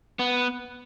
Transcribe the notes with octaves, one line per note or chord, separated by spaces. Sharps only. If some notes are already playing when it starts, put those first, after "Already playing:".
B3